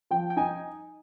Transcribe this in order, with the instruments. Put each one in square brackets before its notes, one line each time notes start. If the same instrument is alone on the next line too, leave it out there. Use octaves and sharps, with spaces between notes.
[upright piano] F3 [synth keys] G5
[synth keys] G5
[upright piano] D#4 [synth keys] G#5